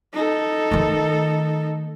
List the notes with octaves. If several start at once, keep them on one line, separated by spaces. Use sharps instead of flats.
D#4 A4
D#3 A3